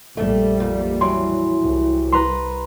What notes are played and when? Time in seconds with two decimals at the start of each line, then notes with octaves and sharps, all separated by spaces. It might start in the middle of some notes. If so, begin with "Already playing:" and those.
0.17 A#1 F2 G3 A3
0.60 A#2
1.01 A2 E3 F#3 C6
1.61 C2
2.12 B4 A#5 C6